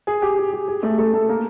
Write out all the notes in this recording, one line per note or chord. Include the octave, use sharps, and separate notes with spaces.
G#4
G4
G#4
G4
G#4
A3 A4
A3 A4
A3 A4
A#3 A#4